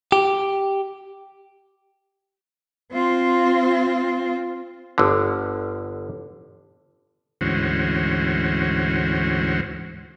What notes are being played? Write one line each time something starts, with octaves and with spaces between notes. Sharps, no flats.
G4
C4 F4
G1 D3
D2 G#2 E3 C#4 F#4 C5